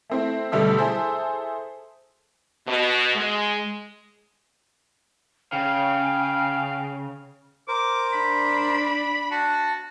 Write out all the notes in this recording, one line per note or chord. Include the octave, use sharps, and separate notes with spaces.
A3 C4 E4
B2 D3 G3 A3 E6
E4 G#4 A4 C5 E5
B2
G#3
C#3 F5 G5
A#4 C5 D6
D4 B5
F#4 A5